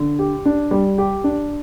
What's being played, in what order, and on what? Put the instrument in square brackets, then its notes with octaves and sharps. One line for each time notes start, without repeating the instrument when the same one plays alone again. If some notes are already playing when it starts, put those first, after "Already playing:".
Already playing: [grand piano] D3
G4
D4
G3
G4
D4